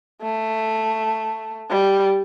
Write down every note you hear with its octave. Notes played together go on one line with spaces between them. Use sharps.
A3
G3